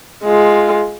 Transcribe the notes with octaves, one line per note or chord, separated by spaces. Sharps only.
G#3 F4